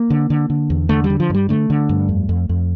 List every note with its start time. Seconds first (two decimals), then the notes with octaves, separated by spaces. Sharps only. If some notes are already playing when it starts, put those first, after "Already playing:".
Already playing: A#3
0.10 D3
0.30 D3
0.50 D3
0.70 E2
0.89 D3 A3
1.04 G3
1.10 D3
1.20 F3
1.30 G2 G3
1.49 D3 A3
1.70 D3
1.89 G2
2.09 F2
2.29 F2
2.49 F2